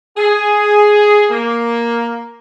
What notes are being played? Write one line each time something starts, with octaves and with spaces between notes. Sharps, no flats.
G#4
A#3